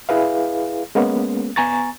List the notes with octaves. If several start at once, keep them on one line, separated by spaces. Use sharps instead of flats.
E4 G#4 B4 F5
G#3 A#3 B3 C#4
B3 G#5 A#5 C#6 A6